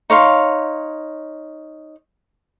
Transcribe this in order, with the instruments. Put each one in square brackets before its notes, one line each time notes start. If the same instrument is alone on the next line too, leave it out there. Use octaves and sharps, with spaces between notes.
[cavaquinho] D#4 C#5 F5 C6